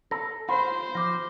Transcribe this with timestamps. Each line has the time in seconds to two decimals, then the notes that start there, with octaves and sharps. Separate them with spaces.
0.11 A4 A#6
0.49 F4 C5 B5
0.95 F3 D6 A#6